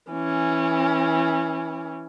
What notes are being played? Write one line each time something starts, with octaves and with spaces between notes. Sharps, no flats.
E3 C#4